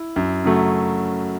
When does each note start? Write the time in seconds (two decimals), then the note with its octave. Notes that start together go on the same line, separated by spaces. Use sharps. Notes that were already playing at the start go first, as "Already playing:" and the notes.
Already playing: E4
0.16 F#2
0.44 C#3 F#3 A3